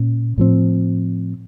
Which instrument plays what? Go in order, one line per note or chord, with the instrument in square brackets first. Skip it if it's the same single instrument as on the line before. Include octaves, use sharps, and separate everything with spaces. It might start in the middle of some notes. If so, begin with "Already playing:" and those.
Already playing: [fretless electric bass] A#2 C#4
A2 F3 C4